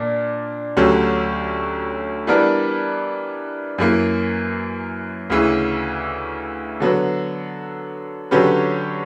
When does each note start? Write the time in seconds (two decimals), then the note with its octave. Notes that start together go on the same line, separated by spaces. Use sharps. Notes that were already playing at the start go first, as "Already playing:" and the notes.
Already playing: A#2 A#3 D4
0.77 D2 D3 F#3 C#4 G4
2.27 E3 G3 B3 D4 A#4
3.78 F#2 E3 A#3
5.30 D2 C#3 E3
6.80 D3 F#3 B3
8.31 D3 F#3 C#4 G4 B4